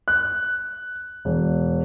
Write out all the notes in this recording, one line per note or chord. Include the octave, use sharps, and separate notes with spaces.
F#6
E1